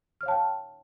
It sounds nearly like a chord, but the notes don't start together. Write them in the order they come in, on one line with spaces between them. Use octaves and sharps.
F6 C#5 F5 A5 G5